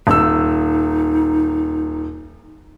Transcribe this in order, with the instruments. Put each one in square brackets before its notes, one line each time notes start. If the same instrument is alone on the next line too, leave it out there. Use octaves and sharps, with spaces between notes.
[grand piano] D#1 E6 [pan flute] D#4